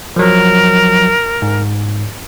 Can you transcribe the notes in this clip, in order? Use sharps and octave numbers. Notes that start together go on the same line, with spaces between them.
F3 F#3 A#4
G#2